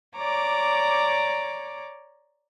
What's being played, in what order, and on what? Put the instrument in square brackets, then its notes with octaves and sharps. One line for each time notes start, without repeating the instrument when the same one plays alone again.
[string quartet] C#5 D5 A#5 D6